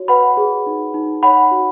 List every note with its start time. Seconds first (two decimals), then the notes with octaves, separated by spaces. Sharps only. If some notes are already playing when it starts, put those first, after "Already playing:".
Already playing: F#4 C#5
0.08 B4 F#5 B5
0.37 G#4
0.67 D#4
0.94 D#4
1.23 C#5 F#5 B5
1.51 F#4